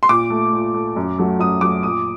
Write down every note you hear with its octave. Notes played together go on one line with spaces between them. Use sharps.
C6
A#2 D6
A3
A#2
A3
F#2
F#3 A3
F#2 D#6
F#3 A3 D6
A#2 D#6